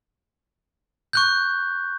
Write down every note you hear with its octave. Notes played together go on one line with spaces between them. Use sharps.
C#6 F#6 G6